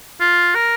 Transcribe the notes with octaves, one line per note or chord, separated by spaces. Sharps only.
F4
A#4